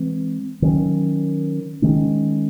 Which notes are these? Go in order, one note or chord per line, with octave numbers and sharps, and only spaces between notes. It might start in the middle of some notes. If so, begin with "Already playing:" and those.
Already playing: E3 G#3 C4
D#3 F#3 C#4
D#3 G#3 C#4